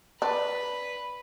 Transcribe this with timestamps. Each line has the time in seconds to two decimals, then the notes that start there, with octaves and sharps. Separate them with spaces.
0.22 D4 B4